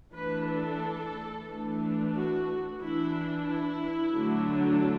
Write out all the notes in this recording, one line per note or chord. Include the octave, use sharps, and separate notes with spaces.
E3 A3 D4 B4
A4
E3 A3 D4
F#4
E3 D4 E4
E4
D3 F#3 A3 D4